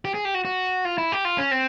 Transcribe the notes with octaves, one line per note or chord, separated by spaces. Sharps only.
G4
G#4
G4
F#4
F#4
F4
E4
G4
F4
C#4
C4